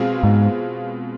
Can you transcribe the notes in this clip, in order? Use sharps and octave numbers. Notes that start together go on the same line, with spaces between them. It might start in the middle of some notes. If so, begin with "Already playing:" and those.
Already playing: B2 G#3 C4 F4 G#4
G#2